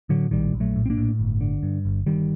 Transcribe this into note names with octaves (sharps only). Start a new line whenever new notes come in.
A2 D3 F#3
A#1 D#3 G3
A#1
F#3 A3
A2
C4
A#3 D4
A2
G1
D3
G2
G1
G1 D#3 G3